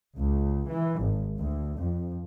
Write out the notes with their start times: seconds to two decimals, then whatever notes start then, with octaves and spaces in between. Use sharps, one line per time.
0.17 C#2
0.68 E3
1.00 G#1
1.38 D2
1.78 F2